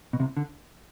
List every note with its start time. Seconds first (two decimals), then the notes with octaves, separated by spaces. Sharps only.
0.13 B2
0.20 C2 C3
0.37 D3